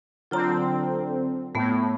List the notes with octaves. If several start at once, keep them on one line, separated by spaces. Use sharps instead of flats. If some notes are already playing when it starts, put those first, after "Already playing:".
D3 F#3 C4 F4 A#5
A2 A3 B3